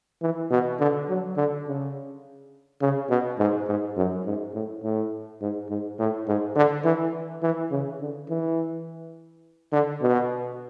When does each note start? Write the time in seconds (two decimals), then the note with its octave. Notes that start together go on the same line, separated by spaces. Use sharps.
0.22 E3
0.51 B2
0.80 D3
1.09 F#3
1.37 D3
1.67 C#3
2.82 C#3
3.10 B2
3.39 G#2
3.68 G#2
3.97 F#2
4.26 G#2
4.54 A2
4.84 A2
5.41 G#2
5.69 G#2
5.99 A2
6.28 G#2
6.56 D3
6.85 E3
7.43 E3
7.71 C#3
8.01 D3
8.30 E3
9.73 D3
10.02 B2